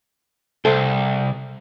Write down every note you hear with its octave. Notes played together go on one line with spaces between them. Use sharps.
C2 A4 C5 E5